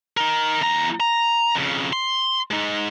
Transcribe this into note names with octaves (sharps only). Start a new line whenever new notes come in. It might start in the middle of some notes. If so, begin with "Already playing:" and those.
D#4 A#4
E2 A#5
A#5
F2 C#3
C6
G#3 D#4